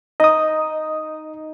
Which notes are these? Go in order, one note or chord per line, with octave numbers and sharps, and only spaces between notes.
D#4 D#5 D#6